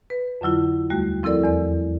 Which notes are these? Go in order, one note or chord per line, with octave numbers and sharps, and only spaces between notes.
B4
F2 D3 F#3 E4 F4
D#2 G3 A3 F#4
F3 C4 E4 A4 A#4 D5
E2 D5